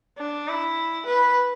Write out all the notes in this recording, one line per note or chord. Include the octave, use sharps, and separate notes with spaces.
D4
E4
B4